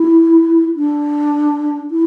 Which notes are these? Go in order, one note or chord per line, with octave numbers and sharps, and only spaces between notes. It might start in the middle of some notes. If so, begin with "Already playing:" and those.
Already playing: E4
D4
E4